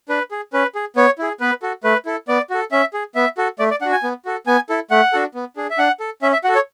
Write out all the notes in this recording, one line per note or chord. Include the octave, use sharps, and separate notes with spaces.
D4 B4
G#4
C#4 B4
G#4
B3 C#5
E4 G#4
B3 B4
F#4 A4
A3 B4
E4 A4
B3 D5
F#4 A4
C#4 E5
G#4
B3 E5
F#4 A4
A3 D5
D5
D4 F#4 F#5
G#5
B3
F#4 A4
B3 G#5
E4 A4
A3 F#5
D4 F#4 A4
B3
D4 G#4
E5
D4 F#5
A4
C#4 E5
E5
F#4 A4 F#5
C#5